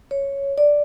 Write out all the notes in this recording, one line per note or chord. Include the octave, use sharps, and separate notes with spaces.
C#5
D5